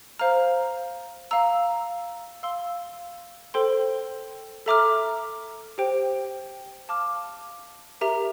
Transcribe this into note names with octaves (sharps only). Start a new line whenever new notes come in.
C5 F5 A#5 F6
F5 A#5 E6
F5 C6 E6
A4 C5 G5 C6
A4 E5 A#5 D6 F6
G4 C5 G5
F5 A5 D6 F6
G4 A#4 E5 A#5